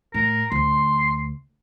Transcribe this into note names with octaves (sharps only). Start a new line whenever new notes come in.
A2 A#4
D2 C6